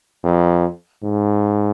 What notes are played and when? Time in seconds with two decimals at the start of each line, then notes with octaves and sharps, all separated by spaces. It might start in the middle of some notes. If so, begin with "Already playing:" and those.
0.24 F2
1.04 G#2